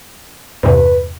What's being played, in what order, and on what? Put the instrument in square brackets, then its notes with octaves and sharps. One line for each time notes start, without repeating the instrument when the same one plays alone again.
[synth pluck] E2 G2 C3 [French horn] B4